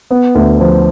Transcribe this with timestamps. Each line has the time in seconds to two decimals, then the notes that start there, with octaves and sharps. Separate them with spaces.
0.10 B3
0.35 D2
0.60 F3